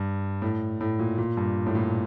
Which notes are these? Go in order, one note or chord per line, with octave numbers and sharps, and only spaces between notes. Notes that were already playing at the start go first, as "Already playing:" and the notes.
Already playing: G2
A2
A2
A#2
A#2
G2
A2
A#2